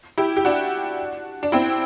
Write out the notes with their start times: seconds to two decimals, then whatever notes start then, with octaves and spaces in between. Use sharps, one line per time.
0.18 E4 G4
0.37 G4
0.45 D4 F#4
1.43 D4
1.52 C4 E4